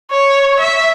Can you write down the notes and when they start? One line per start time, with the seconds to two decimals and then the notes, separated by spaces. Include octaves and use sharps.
0.11 C#5
0.59 E5